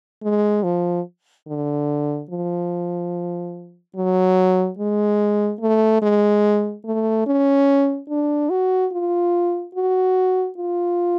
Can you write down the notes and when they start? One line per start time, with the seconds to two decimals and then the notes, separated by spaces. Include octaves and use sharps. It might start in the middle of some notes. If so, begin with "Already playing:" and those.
0.23 G#3
0.64 F3
1.47 D3
2.30 F3
3.96 F#3
4.79 G#3
5.61 A3
6.02 G#3
6.85 A3
7.27 C#4
8.10 D4
8.50 F#4
8.92 F4
9.75 F#4
10.58 F4